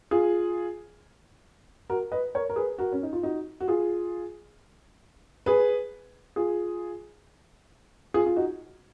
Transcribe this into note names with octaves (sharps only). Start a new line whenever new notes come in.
F4 G#4
F#4 A#4
B4 D#5
A#4 C#5
A#4
G#4 B4
F#4 A#4
C#4
D#4
F4
D#4 F#4
F#4
F4 G#4
G#4 B4
F4 G#4
F4 G#4
F4
D#4 F#4